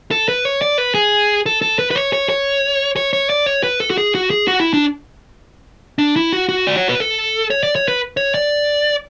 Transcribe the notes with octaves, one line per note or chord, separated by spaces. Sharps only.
A4
B4
C#5
D5
B4
G#4
A4
A4
B4
B4
C#5
C#5
C#5
C#5
C#5
D5
C#5
B4
A4
F#4
G#4
F#4
G#4
F#4
E4
D4
D4
E4
F#4
F#4
D5
C#5
B4
A4
C#5
D5
C#5
B4
C#5
D5